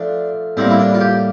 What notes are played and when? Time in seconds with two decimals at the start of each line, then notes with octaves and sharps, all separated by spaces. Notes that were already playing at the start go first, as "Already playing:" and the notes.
Already playing: F3 A3 D4
0.57 A2 G3 A#3 C4
0.70 E4
0.79 D4
0.94 F4
1.00 G4